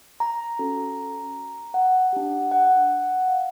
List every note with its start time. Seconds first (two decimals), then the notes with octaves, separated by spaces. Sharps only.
0.20 A#5
0.59 C#4 F#4 A4
1.74 F#5
2.13 D4 G4
2.51 F#5
3.28 F5